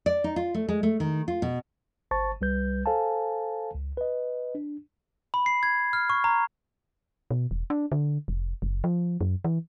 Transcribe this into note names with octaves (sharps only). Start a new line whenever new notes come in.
D5
D#4
F4
A3
G#3
A3
D#3
F4
B2
G1 C5 A5 C#6 A6
C2 G3 B4 G6
A4 C5 F5 G#5 A5
C#2
B4 D#5
D4
B5
C7
G#6
F6
C#6
A#5
B2
E1
D4
D3
F1
F#1
F3
F#2
E3